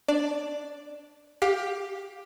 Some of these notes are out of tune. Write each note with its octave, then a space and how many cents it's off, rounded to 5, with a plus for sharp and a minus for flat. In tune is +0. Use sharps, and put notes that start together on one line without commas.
D4 +5 D5 +0
G4 +5 F5 +25